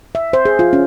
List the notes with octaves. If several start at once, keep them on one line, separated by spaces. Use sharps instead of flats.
E5
C5
G#4
F4
C#4